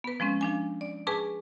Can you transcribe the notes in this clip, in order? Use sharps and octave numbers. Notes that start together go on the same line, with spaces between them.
B3 B4
F3 G#3 C4 C#4
F3 D4 G#5
D5
G#4 B4 G#5 A5 C#6 D6